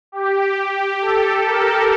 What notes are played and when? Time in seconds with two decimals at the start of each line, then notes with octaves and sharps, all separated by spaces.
0.12 G4
0.57 G4
1.01 A4
1.46 A#4